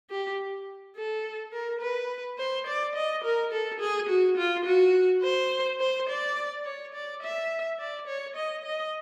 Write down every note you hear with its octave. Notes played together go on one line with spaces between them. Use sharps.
G4
A4
A#4
B4
C5
D5
D#5
A#4
A4
G#4
F#4
F4
F#4
C5
C5
D5
C#5
D5
E5
D5
C#5
D#5
D#5